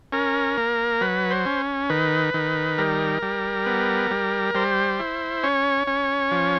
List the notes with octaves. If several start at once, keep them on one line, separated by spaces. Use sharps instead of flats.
C#4 A#4
A#3
F#3 B4
C5
C#4
D#3 B4
D#3
G3 A#4
G3
B3
G3
G3 C5
E4
C#4 C#5
C#4
F3